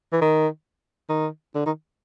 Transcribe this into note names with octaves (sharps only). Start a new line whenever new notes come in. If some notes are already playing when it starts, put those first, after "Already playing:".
E3
D#3
D#3
D3
D#3